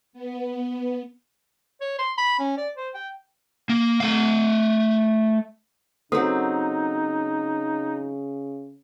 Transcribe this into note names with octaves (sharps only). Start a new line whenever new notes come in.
B3
C#5
C6
B5
C#4
D5
C5
G5
A#3
A3 F5
C#3 F#3 C4 D#4 A4